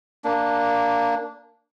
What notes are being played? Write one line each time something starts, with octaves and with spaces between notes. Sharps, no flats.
A#3 D4